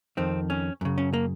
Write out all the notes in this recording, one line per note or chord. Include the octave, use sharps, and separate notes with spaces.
F2 D#3 C4
C#4
F#2 C#3
C#4
A#3